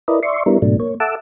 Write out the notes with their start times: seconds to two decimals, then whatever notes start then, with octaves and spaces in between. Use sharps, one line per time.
0.08 E4 A#4 B4 D5 D#5
0.23 D5 E5 C6 C#6
0.46 G3 B3 D4 E4 A#4
0.62 G#2 B2 F#3 A3 D4
0.80 A#3 C#5
1.00 A4 E5 F#5 A5 D6 E6